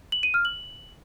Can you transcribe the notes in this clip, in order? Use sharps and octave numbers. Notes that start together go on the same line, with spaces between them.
F#7
D#7
F6
F#7